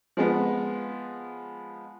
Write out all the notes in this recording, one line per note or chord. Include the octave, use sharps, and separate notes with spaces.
F3 G#3 B3